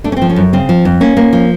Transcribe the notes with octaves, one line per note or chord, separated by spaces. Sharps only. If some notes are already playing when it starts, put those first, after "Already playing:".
A3 D4
C#4
F3 C4
C#4
F#2
C#3 C4
F3
F2
A#3 C#4
A#3
F3